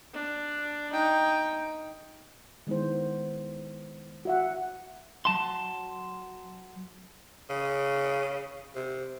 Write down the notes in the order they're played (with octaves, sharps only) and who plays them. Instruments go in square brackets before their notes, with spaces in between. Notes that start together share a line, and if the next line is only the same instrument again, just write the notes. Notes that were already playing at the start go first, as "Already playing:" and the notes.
[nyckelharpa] D4
D#4 G5
[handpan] D#3 G#3 B3 E4 C5
F#4 E5 F#5
[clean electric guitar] F#3 A5 C6
[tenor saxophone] C#3
C3